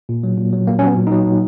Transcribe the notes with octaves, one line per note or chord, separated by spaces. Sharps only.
A#2
F#3
A#2
F#3
A#2 A#3
C#4
F#3 B3
A#2
F#3 D#4
A#2